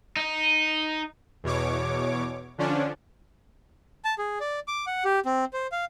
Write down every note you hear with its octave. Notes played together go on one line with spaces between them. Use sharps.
D#4
E2 B2 C#5 D6
D3 F3 C#4 D4
A5
G#4
D5
D6
F#5
G4
C4
C5
F5